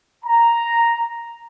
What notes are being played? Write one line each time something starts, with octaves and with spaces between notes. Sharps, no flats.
A#5